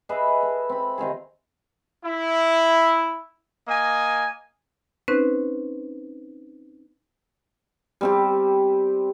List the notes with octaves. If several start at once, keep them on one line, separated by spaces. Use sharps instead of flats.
G#4 B4 D#5 E5
A4
C4 B5
C3 D#3 F4 G#4
E4
A#3 D#5 G#5
C4 C#4 D#4 B4 C5 F#6
G3 C4 G4